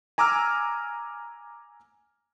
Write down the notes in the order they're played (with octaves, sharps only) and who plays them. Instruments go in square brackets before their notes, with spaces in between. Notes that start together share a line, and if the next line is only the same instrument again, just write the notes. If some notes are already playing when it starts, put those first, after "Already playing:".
[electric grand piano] G#5 A#5 D6 E6 F6